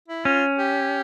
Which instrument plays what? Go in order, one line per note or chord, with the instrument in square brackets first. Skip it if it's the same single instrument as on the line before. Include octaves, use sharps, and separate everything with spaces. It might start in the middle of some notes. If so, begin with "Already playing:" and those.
[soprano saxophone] E4
[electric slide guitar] C#4 [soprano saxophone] F4
[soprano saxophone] G4